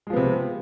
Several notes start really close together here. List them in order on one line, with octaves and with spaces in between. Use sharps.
G#3 F3 B3 C3